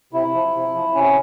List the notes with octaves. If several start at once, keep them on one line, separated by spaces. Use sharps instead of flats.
C3 E4
F3
C3
F3
C3 C#4